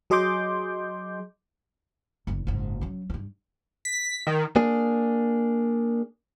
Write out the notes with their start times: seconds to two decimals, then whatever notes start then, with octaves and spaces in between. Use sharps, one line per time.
0.10 F#3 G#4 D#5 C6 D6 G6
2.27 F#1 E2
2.47 F#1 G#2
2.81 F#3 C#4
3.10 G2 E4
3.85 B6
4.27 D#3
4.56 A#3 D4 G#4